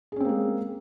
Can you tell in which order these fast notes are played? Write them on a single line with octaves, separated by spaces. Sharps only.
G#4 C#4 C4 A#3 G#3